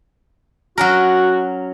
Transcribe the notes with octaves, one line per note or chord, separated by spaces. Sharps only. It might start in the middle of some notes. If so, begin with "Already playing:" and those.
F#3 C#4 F#4 A#4